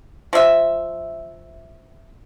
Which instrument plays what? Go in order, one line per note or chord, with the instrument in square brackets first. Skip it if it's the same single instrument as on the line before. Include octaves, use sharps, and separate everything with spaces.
[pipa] F3 E5